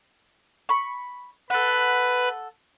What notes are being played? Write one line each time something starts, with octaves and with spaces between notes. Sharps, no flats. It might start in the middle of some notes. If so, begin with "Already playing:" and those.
B5 C#6
A4 B4 F#5